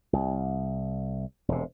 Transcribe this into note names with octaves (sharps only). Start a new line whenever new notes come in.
C2
E1 C3